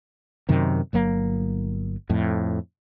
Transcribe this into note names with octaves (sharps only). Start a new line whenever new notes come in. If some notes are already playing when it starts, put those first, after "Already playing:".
F#2 C3 D#3
G1 F#3 A#3
F2 A2